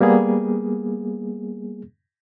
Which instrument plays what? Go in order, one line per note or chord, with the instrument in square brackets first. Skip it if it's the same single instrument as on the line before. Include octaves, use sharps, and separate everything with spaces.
[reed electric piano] G3 A#3 B3 G#4